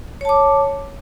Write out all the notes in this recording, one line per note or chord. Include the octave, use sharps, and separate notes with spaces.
C#5 A5 D6